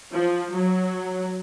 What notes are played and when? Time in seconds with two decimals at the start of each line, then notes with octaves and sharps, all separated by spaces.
0.11 F3
0.51 F#3